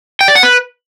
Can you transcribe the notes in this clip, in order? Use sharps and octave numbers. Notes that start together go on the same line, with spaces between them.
G5
D5
F#5
B4